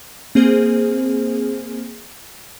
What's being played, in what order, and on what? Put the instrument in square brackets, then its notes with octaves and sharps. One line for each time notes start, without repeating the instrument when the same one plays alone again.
[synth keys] A#3 C4 G#4 C5